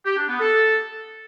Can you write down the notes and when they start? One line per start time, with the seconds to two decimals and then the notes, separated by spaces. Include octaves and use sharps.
0.06 G4
0.17 D4
0.29 B3
0.40 A4